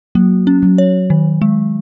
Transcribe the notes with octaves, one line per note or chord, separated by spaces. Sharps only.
F#3 A#3
C#4
F#3
C#5
D#3
G#3